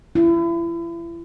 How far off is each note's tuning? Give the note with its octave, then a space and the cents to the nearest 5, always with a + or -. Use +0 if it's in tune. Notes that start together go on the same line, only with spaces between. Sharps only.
E4 +35